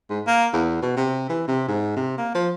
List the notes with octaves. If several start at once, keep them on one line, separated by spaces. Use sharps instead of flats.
G#2
A#3
E2
B2
C3
E3
C3
G#2
C3
A#3
F3